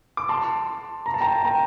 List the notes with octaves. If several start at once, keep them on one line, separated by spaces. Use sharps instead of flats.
D6
A5 C6
A#5
A5
G5 A#5
G5 A#5